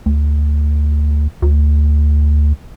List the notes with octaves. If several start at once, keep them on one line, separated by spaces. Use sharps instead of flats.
D2
D2